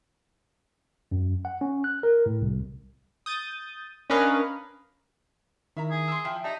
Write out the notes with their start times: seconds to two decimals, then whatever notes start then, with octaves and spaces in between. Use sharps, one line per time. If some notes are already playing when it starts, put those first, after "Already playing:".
1.12 F#2
1.45 F#5
1.61 C#4
1.84 F#6
2.03 A#4
2.26 A2
2.42 C2
3.26 D#6 G6 A6
4.10 C#4 D4 A#4 B4 D#5 F5
5.77 D#3 E4 E5 A#5
5.90 G#4
6.08 C6 E6
6.25 F3 E4 G5 G#5
6.44 D#4 G4 D5 E5 A5